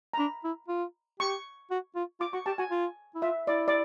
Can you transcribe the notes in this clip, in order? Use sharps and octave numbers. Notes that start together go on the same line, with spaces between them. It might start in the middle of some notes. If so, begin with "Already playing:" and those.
A#5
D4 B5
E4
F4
G4 C#6
F#4
F4
F4 D6
F#4 C#6
G4 A5
F#4 G#5
F4
E4
F4 E5
E4 D5
D5